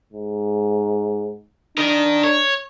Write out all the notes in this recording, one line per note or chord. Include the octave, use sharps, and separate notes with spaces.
G#2
D4 A#4 D#5
C#5